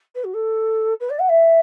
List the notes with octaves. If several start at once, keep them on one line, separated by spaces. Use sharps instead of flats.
B4
F#4
A4
B4
D5
F#5
E5